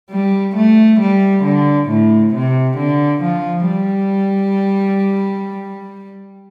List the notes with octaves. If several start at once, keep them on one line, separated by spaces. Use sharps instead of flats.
G3
A3
G3
D3
A2
C3
D3
F3
G3